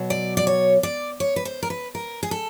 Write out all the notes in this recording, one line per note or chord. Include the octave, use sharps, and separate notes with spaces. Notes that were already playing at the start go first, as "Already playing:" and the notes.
Already playing: B2 F#3
D5
D5
C#5
D5
C#5
B4
C5
A#4
B4
A#4
G#4
A4